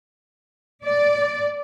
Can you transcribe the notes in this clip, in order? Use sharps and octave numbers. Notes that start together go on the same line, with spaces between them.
D5